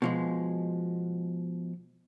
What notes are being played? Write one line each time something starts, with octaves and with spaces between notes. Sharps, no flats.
B2 F3 G#3